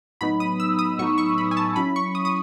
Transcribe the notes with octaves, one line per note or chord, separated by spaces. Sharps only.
A2 F#3 B3 D#4 B5
D#6
E6
D#6
A2 F#3 B3 D#4 C#6
C#6
B5
G#5
A5
F#3 C#4 E4 B5
C#6
D#6
D#6